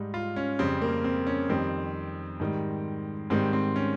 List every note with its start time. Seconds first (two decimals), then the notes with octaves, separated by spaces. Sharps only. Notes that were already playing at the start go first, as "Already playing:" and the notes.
Already playing: G#2 G3 D#4
0.14 F4
0.36 C#4
0.59 F2 C#3 G3 C4
0.82 A#3
1.04 C4
1.27 C#4
1.49 F2 D#3 G3 C4
2.40 G#2 D#3 G3
3.30 G#2 D#3 G3 C4
3.53 C4
3.76 C#4